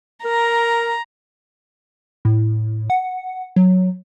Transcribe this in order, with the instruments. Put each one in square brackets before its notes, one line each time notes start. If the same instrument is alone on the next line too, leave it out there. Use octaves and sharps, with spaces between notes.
[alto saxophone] A#4 [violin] A#5
[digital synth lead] A2
F#5
F#3